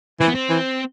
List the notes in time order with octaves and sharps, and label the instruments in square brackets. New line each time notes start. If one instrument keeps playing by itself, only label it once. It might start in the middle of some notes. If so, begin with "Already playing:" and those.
[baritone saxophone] E3 [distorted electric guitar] C4
[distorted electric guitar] B3
C4
[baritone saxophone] E3